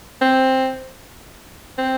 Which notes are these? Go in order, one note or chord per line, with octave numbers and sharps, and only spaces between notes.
C4
C4